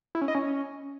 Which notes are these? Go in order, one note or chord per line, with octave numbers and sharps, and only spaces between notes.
E4
C#4
D#5
C#4